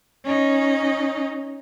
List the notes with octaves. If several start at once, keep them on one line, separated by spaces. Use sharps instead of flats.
C#4 D#4